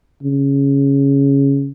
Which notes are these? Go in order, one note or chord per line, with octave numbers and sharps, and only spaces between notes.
C#3